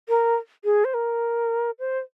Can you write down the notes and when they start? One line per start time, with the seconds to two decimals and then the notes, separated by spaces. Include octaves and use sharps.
0.09 A#4
0.64 G#4
0.85 C5
0.94 A#4
1.79 C5